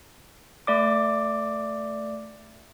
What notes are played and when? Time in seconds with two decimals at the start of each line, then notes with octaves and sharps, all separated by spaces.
0.67 A3 D5 D6